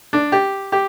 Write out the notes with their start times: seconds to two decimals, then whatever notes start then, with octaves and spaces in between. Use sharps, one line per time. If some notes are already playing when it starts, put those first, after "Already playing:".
0.13 D4
0.32 G4
0.72 G4